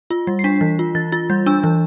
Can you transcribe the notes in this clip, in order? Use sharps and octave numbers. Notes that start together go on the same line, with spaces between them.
F4
G3
C7
D4 B6
E3
F4
E3 A6
F4 A6
G3 G6
D4 E6
E3